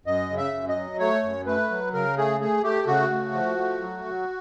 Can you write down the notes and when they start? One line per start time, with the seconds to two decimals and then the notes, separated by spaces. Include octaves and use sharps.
0.05 F#2 D#5
0.30 C#3
0.37 E5
0.53 F#2
0.69 D#5
0.76 F#3
0.99 A3 C#5
1.23 F#2
1.46 A3 B4
1.71 F#3
1.93 C#3 A#4
2.17 A3 G#4
2.40 A3 G#4
2.63 A3 G4
2.87 C#3 F#4
3.10 A3
3.34 F3
3.58 A3
3.81 F#3
4.04 F#3